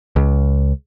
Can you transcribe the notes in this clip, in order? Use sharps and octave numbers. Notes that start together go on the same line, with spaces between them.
C#2